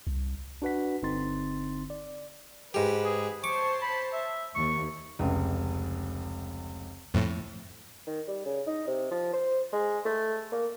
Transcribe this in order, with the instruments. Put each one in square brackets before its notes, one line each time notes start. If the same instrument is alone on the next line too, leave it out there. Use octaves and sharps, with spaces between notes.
[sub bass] C2
[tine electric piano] D4 F#4 B4 F#5 B6
G1 D3 C4 D#4 C6 A6
D5
[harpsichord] G#2 G4 [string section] B4
[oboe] G#4
[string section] C5 C#5 A5 [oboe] C#6 [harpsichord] D6
[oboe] B5
E5
[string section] D#2 [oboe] C#6
[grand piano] F1 C#2
[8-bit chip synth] F2 A2
[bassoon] D#3
G3
C#3
D#4
C3
F3
C5
G#3
A3
A#3